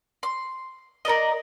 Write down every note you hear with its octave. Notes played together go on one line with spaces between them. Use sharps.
C6
A#4 B4 D5 D#5